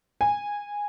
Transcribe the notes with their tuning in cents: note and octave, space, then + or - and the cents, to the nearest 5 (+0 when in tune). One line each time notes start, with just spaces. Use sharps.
G#5 -15